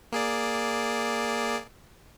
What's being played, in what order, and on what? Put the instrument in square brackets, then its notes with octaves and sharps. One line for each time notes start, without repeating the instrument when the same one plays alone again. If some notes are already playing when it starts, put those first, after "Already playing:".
[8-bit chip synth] A#3 G#4 D5